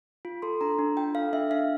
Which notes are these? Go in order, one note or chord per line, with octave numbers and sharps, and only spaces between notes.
F4
A4 C6
D4 A#5
D4
F4 G5
A4 F5
D4 E5
D4 F5